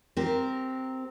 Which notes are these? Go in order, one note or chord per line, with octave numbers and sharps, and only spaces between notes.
C4 G4 A#4